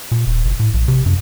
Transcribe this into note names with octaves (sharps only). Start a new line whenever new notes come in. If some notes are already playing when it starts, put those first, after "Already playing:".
A#2
D#1
F#1
A2
A#1
C3
F#2